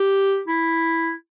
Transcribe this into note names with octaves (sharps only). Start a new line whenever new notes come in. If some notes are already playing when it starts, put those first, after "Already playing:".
Already playing: G4
E4